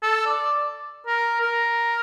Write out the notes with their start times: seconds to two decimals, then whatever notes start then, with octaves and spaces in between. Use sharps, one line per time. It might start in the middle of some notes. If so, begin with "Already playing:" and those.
0.03 A4
0.26 D5
1.07 A#4
1.41 A#4